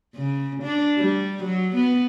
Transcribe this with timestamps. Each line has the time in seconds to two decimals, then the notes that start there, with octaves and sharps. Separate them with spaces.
0.15 C#3
0.63 D4
0.98 G3
1.43 F#3
1.76 B3